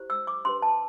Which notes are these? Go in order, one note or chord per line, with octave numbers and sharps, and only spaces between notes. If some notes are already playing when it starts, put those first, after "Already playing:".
Already playing: E4 G4 C5
E6
D6
D4 G4 B4 C6
A5